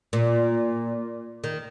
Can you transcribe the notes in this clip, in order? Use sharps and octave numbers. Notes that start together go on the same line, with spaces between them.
A#2
D#3